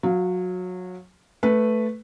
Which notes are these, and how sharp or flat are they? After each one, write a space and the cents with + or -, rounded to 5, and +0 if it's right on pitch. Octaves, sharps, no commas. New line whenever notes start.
F#3 -20 F5 +0
A3 +0 B4 +0